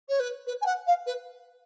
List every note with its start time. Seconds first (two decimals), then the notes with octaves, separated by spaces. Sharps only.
0.08 C#5
0.19 B4
0.46 B4
0.61 G#5
0.65 F#5
0.86 F5
1.06 B4